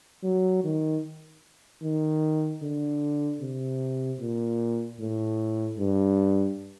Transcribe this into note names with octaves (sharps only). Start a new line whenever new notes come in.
F#3
D#3
D#3
D3
C3
A#2
A2
G2